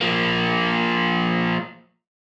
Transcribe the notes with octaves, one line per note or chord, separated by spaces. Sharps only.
F3 A#3